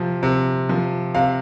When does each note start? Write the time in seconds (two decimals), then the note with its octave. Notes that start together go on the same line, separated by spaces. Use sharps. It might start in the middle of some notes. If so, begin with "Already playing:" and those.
Already playing: C3 F3
0.23 C3
0.69 F3
1.15 C3 F5